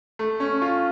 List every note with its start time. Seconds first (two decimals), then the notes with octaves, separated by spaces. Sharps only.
0.19 A3
0.40 C#4
0.62 F4